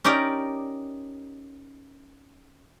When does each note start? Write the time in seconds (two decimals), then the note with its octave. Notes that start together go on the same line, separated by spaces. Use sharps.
0.04 C#4 D#4 G4 A#4 D5